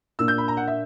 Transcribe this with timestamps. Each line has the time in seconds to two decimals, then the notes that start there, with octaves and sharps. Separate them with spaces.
0.19 A#2 A#3 D4 E6
0.28 G6
0.38 B5
0.48 A#5
0.57 F#5
0.68 E5